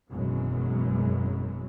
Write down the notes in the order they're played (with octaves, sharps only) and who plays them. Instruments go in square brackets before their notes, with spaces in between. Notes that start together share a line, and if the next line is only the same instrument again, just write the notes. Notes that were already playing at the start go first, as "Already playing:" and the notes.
[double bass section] G#1 F#2 B2 E3 F#3 G#3